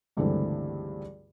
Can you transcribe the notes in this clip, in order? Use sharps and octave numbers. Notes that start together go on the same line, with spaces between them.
C#2 G2 D3 E3 A3 C4